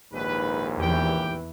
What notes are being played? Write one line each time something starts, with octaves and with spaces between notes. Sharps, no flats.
A#1 D#2 G#2 B4
E2 E3 G4 G5